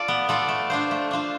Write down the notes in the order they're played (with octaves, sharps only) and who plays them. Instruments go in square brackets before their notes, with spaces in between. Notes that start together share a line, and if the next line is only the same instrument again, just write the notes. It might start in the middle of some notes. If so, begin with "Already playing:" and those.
Already playing: [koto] F4 A4 D5
B3
F4 A4 D5
A3
D4 F4 C5
A3
D4 F4 C5